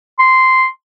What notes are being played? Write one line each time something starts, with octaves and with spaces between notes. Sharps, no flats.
C6